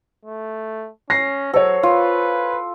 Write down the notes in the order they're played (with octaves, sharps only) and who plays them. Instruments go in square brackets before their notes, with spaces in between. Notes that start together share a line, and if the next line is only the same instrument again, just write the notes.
[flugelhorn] A3
[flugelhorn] C#4 [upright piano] A#6 C7
[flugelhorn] F#3 [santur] A4 [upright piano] C5 C#5
[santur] F4 [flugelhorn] B4